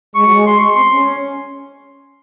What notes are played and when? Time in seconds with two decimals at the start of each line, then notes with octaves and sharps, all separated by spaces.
0.15 G#3 C#6
0.24 F#3
0.31 G#3
0.46 C6
0.59 C#6
0.70 C6
0.76 C4
0.93 C#4